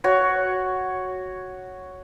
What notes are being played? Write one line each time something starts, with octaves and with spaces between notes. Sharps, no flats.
F#4 C#5